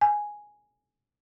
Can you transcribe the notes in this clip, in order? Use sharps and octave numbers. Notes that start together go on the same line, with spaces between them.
G#5